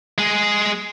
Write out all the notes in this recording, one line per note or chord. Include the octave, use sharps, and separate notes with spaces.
G#3 G#4